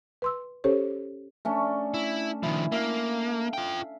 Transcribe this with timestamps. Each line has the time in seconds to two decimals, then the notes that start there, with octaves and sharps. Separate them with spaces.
0.22 B4 C6 E6
0.64 C#4 G4 A4 C5 C#5
1.45 A3 C#4 D4
1.94 E4
2.43 D#3 F3 E4
2.72 A#3 E5 F5
3.53 F4 G5